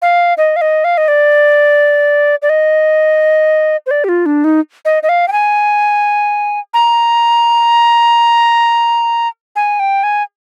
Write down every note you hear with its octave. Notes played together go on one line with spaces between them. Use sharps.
F5
D#5
F5
D#5
F5
D#5
D5
D5
D#5
C5
D5
G4
F4
D4
D#4
D#5
D#5
F5
G5
G#5
A#5
G#5
G5
G#5